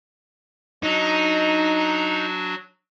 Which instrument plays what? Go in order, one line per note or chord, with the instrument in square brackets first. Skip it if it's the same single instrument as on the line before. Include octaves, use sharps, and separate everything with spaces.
[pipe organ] F#3 D4 F#4 [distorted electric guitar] D#4